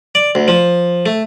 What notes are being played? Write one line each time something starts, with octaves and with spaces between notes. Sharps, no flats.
D5
D2
F3
A3